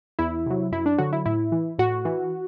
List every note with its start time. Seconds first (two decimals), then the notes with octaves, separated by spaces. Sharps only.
0.19 E2 E4
0.46 C3 F#3
0.72 F#2 E4
0.86 D4
0.98 D3 F#3 F#4
1.13 E4
1.26 A2 E4
1.52 E3
1.79 A2 F#4
2.05 E3